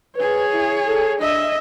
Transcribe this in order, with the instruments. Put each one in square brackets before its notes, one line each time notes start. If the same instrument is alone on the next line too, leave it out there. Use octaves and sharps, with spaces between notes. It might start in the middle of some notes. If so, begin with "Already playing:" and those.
[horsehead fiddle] G#4 C#5 [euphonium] B4
[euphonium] E4
A4
[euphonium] D4 [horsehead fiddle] D#5 E5